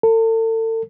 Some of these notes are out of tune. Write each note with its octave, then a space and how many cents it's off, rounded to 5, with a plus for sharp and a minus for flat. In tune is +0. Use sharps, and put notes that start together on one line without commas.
A4 +40